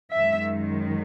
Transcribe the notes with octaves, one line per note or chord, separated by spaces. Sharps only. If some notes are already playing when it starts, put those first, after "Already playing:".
F#2 D#3 G#3 E5